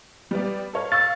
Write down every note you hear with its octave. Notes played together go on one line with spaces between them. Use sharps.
G3 B3 D5
A4 C#5 F5
F5 C#6 E6 A6